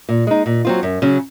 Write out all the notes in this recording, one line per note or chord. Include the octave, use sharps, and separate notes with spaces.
A#2
G#3 D#4
A#2
F#3 C4 F4
F#2
C#3 F#3 C#4